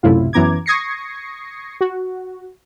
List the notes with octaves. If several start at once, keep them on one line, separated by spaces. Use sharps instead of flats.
B1 F#2 A2 C3 E4 F4
F#2 E3 B3 A#5 D6 G#6
C#6 D#6 G#6 A#6 C7 C#7
F#4